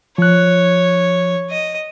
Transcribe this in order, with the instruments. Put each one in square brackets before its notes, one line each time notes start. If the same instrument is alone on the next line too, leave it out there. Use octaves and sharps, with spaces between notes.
[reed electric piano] F3 F#6 [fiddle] C#5
[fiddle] D#5